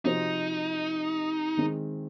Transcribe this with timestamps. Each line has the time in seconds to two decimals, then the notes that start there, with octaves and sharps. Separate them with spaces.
0.05 C3 F3 C4 D#4 F#4 C5
1.57 D#3 G#3 C4